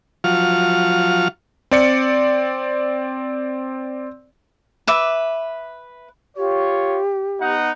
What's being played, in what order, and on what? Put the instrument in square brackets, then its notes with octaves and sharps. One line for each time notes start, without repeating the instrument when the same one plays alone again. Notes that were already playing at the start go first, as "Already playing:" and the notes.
[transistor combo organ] F3 F#3 F4 C#6 F6
[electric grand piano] C4 D5 C#7
[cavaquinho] B4 E5 D6
[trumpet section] F4 C#5 [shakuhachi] G4
[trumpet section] B3 D#4 F#5